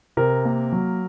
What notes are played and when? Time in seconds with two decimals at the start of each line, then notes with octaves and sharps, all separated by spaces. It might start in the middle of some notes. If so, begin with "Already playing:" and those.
0.17 C3 A#4
0.45 A#3
0.72 F#3